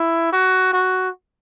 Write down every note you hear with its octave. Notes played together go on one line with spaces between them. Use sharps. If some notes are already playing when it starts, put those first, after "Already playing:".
Already playing: E4
F#4
F#4